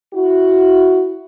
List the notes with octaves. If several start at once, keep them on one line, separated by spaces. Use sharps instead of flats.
E4 F#4